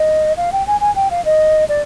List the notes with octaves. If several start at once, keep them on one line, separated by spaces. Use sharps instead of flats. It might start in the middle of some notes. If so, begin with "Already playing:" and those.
Already playing: D#5
F5
G5
G#5
G#5
G5
F5
D#5
D5